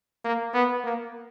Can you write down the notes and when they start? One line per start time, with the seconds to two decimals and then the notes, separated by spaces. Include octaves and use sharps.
0.24 A#3
0.54 B3
0.84 A#3